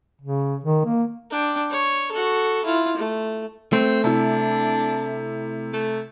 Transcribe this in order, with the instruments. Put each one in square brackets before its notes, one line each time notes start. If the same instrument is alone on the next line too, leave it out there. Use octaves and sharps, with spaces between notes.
[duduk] C#3
D#3
A#3
[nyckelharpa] D4 G5
C#5
F#4 A4
E4 F4
A3
[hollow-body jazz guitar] A3 [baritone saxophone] C4
[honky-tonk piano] C3 E4 [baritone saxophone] D4
[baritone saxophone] A3